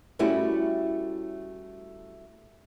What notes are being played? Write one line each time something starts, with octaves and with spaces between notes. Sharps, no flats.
G3 A3 C#4 E4 F#4 G4